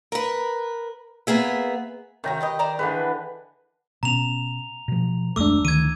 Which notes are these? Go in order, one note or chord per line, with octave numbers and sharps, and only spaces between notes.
A#4 B4
A#3 B3 G#4 E5
C3 D#3 C#4 F#4 G5 A#5
G4 B4 D#5
C5 D5 A#5
D3 E3 G#3 B4
B2 C#4 A#5 F7
B2 F3
D1 F2 G#3 A3 D4 D6 E6
D2 D#3 E3 G#6 D#7